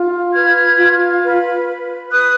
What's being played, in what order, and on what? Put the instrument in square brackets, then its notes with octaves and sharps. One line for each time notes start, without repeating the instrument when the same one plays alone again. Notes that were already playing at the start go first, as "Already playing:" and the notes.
Already playing: [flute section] F4
B4 F6 G#6
F4
B4
B4
B4 D#6 F#6